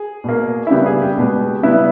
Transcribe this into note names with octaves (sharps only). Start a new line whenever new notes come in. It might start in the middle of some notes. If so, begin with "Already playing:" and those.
Already playing: G#4
B2 A#3
E4
C#3 G3 B3 G4
G#4
G4
B2 G#3 B3
C#3 G3 B3 E4